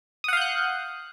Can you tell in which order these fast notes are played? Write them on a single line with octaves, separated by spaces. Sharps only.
D#6 F#5 F5 G6 F#6